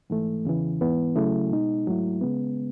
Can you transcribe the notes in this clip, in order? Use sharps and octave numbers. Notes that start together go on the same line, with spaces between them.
G#2 E3 A3
E2 C#3 E3
G#2 E3 B3
C#3 F#3 A3 E4
B2 G#3 D#4
G#2 F#3 A3 E4
C#3 G#3 B3